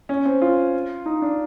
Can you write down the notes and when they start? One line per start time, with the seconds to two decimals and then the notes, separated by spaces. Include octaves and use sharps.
0.09 C#4
0.25 C4
0.42 F4
1.06 D#4
1.22 D4